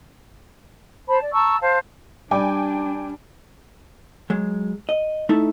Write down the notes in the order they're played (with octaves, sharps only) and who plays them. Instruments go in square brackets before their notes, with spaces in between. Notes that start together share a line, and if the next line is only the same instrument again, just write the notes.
[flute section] C5 A5 B5
D5
A5 A#5 C#6 E6
C5 F5 A5
[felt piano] G3 D5 [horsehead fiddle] D4 [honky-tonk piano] G5 G#5 D6
[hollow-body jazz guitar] F#3 G#3
D#5
A3 D#4 E4 A4 E5